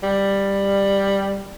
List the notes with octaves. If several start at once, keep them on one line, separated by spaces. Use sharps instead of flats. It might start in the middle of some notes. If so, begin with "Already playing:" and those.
G3